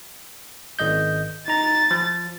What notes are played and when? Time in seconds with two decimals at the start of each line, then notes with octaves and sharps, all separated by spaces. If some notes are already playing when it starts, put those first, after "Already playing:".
0.79 G#1 D#5 G6
1.48 D#4 A#5 A6
1.91 F3